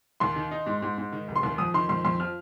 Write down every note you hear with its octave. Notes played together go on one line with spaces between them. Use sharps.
D#2 C6
D#3
D#4
G#2
G#2
G#2
D#3
F1
C6
D#2
F2 D#6
D#3 C6
F2 C6
F2 C6
F3 F6